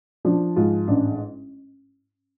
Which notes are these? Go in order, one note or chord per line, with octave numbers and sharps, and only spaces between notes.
F3 D4
G#2 F4
A1 D4